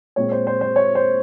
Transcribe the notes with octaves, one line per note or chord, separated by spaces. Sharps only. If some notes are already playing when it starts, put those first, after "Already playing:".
A#2 G#3 C4 C#5
C5
C5
C5
C#5
C5